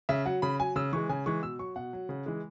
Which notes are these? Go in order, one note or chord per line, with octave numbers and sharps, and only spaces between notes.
C#3 E5
F#3 F#5
C#3 B5
F#3 G#5
C#3 E6
E3 G#3 C#6
C#3 G#5
E3 G#3 C#6
B2 E6
F#3 C#6
B2 F#5
F#3
C#3
E3 G#3